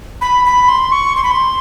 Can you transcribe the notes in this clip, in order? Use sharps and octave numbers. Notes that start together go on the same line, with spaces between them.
B5
B5
C6
C#6
C6
B5
C6